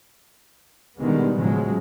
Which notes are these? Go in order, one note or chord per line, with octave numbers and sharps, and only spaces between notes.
B2 D3 D#3 G3 G#3 B3
A2 C#3 F3 F#3 G#3